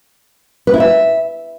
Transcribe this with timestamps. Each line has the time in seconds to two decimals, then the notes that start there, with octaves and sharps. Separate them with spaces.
0.67 B4
0.74 E4
0.80 E5